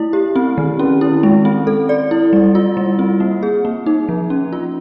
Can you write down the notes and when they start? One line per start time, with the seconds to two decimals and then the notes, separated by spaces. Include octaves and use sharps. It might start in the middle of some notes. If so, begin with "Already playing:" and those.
Already playing: A3 E4
0.13 G4
0.36 C4
0.58 D#3
0.79 C#4
1.01 E4
1.23 G#3
1.45 C4
1.67 A4
1.89 D5
2.11 E4
2.33 G3
2.55 F4
2.77 G3
2.99 C4
3.20 A#3
3.43 G#4
3.65 A#3
3.86 D#4
4.09 F3
4.30 C#4
4.53 F4